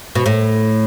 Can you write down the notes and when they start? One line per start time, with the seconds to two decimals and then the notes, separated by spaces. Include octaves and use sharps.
0.15 B2
0.26 A2